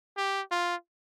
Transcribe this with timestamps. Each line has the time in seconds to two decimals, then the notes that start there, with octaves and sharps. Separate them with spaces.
0.17 G4
0.51 F4